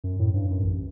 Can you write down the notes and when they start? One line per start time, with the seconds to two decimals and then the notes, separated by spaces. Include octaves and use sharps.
0.04 F#2
0.19 A2
0.34 G2
0.51 F#2
0.63 A1